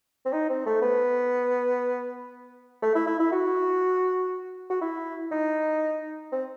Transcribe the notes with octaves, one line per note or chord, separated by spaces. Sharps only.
C4
D#4
C4
A3
B3
A3
E4
E4
E4
F#4
F#4
E4
D#4
C4